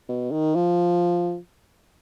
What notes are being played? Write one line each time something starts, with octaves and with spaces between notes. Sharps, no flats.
B2
D#3
F3